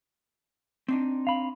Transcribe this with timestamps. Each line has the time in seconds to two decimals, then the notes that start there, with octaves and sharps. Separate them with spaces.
0.88 C4 D4 D#4
1.27 F5 B5